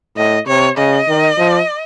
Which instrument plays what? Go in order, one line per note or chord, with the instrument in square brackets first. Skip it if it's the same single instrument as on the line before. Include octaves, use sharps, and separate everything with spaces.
[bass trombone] A2 [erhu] D#5
[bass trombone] C3 [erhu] C#5
[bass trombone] C#3 [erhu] D#5
[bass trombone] D#3
F3